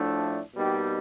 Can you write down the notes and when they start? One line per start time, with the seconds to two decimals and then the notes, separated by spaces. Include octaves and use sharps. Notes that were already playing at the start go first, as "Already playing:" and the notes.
Already playing: A2 F3 A3 D4
0.55 B2 G3 A#3 D#4 G4